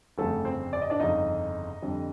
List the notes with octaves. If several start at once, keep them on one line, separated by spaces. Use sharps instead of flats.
G1 F2 C#3 A3 A4
C4 C5
D5
D#5
D4 D5
G1 F2 C#3 D#4 D#5
F2 D3 G3